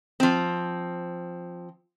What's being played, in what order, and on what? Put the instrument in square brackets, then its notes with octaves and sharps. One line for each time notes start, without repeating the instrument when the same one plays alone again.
[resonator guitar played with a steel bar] F3 C4